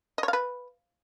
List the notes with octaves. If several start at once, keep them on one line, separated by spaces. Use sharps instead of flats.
D#5
C#5
F5
B4